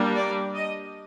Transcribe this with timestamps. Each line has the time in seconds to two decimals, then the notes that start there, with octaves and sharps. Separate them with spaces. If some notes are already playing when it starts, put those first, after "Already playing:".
Already playing: G3 A#3 D4
0.15 D5
0.55 D#5